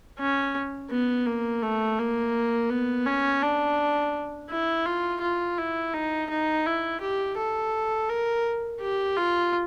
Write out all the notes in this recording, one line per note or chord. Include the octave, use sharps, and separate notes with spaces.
C#4
B3
A#3
A3
A#3
B3
C#4
D4
E4
F4
F4
E4
D#4
D#4
E4
G4
A4
A#4
G4
F4